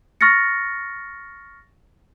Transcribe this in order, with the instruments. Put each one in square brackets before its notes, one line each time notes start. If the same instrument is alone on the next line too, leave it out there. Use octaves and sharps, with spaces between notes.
[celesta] C#6 F6 A6 A#6 C#7